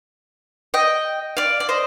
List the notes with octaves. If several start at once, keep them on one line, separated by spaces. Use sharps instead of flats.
D#5 G5
D5 F5
D5
C5 D#5